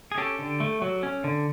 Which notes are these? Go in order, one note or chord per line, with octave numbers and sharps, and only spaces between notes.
G#4
C#4 G4 A4
D3
A3
F#3
C#4
D3